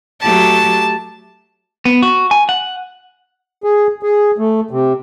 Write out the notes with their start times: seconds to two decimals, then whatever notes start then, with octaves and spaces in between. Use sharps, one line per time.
0.21 F#3 A3 G4 A5
1.85 B3
2.02 F#4
2.31 G#5
2.49 F#5
3.64 G#4
4.03 G#4
4.38 A3
4.71 C3